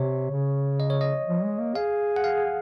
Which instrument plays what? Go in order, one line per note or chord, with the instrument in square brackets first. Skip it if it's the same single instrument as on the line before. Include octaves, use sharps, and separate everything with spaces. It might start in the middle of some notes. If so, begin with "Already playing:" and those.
Already playing: [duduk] C3 [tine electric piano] C#5
[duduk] C#3
[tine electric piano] D#5
C#5
D#5
[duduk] F3
G#3
A#3
[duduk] G#4 [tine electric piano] F5
[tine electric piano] F#5
F5